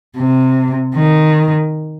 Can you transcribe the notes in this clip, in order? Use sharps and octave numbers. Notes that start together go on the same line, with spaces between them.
C3
D#3